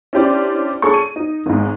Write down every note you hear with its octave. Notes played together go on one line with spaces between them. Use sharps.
C#4 D4 E4 G4 C5 D5
D4 G#4 A4 C#5 C#6
D#7
D#4
G#1 G#2